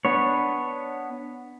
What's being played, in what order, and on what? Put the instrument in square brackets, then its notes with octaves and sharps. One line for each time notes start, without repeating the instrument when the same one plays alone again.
[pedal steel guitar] B3 D4 C#5